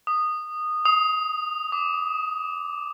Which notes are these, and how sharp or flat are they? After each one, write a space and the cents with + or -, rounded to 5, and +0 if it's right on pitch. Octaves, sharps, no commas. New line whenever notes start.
D#6 -15
D#6 +20
D6 -5